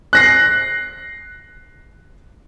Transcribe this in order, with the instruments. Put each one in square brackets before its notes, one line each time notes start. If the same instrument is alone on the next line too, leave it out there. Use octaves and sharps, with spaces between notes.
[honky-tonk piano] F#6 A#6 C7